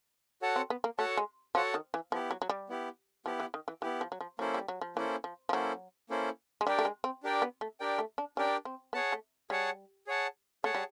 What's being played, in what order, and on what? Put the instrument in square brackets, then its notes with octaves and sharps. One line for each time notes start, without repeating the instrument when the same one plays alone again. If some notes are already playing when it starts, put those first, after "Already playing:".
[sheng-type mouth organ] F#4 A4 C#5 F#5 A5
[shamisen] C4
B3
A#3
[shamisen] A3 [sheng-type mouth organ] F#4 A4 C#5 F#5 A5
[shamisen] G#3
[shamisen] F3 [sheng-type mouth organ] F#4 A4 C#5 F#5 A5
[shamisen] D#3
E3
[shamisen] F3 [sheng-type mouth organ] B3 E4 G4
[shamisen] F#3
F#3
G3
[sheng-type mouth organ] B3 E4 G4
[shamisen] F3 [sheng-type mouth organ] B3 E4 G4
[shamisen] E3
D#3
E3
[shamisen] E3 [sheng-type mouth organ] B3 E4 G4
[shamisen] F3
F#3
F3
[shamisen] F#3 [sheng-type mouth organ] A#3 C#4 E4 A4 C5
[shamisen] G3
F#3
F3
[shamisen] E3 [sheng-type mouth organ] A#3 C#4 E4 A4 C5
[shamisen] F3
F3
[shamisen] F#3 [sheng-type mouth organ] A#3 C#4 E4 A4 C5
[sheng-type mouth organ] A#3 C#4 E4 A4 C5
[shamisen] G#3
[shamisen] G3 [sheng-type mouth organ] D4 G4 A#4 D5 G5
[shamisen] A3
G#3
C4
[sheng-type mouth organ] D4 G4 A#4 D5 G5
[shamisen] B3
A3
[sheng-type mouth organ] D4 G4 A#4 D5 G5
[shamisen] A3
D4
[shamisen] C#4 [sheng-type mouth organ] D4 G4 A#4 D5 G5
[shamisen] C4
[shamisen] B3 [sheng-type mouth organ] G#4 C#5 F#5 A5
[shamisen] A3
[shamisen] G3 [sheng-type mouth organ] G#4 C#5 F#5 A5
[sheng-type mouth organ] G#4 C#5 F#5 A5
[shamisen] A3 [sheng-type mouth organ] G#4 C#5 F#5 A5
[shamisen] G3